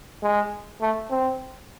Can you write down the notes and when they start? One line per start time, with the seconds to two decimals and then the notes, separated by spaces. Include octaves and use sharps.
0.23 G#3
0.81 A3
1.11 C4